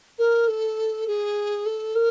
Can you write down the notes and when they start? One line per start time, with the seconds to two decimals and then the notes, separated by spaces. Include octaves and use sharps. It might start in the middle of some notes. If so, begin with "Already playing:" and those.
0.19 A#4
0.48 A4
1.08 G#4
1.66 A4
1.95 A#4